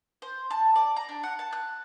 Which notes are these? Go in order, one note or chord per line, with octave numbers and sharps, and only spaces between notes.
C5
A5
D5
A#5
D4
F#5
A5
F#6